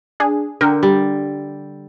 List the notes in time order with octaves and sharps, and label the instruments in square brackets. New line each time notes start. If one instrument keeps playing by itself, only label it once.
[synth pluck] D4 G#4
[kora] D3 [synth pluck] A#4 G5
[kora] G3